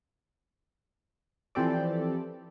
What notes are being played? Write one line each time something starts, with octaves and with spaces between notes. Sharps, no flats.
E3 F3 C4 G4 A4 D5